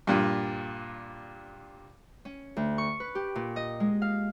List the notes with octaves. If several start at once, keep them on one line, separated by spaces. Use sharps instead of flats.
G2 A#2
C#4
D2
C#6
B4
G4
A#2
D#5
G#3
F5